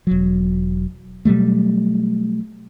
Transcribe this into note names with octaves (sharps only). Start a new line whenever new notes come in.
E1 F#3
B2 F#3 G3 A3